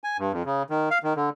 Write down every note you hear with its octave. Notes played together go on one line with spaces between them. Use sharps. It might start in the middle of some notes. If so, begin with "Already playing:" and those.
G#5
G2
F2
C#3
D#3
F5
D#3
D3